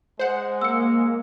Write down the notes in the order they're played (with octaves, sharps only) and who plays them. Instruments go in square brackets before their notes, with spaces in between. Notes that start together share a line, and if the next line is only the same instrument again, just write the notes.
[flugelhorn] G#3 [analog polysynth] C5 F#5
[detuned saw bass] A#3 [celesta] E6 C#7